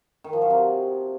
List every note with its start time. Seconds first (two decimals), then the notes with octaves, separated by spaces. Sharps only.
0.24 D#3
0.33 F3
0.42 F#3
0.50 C3